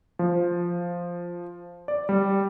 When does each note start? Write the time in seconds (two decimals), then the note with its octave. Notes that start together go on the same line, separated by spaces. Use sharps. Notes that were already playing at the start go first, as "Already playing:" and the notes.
0.19 F3
1.88 D5
2.09 G3